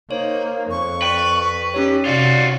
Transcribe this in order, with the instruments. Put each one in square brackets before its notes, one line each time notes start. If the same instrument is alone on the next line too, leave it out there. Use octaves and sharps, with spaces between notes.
[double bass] A#3 [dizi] D#4 [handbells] C5 C#5
[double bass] F2 [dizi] C#6
[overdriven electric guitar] B4 [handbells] D5 G5
[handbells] C#4 D#4 C#5 [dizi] G4
[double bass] C3 [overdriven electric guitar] F4 F#4 [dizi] D5